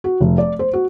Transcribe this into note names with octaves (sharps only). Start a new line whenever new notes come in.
F#4
F1
D5
C5
F#4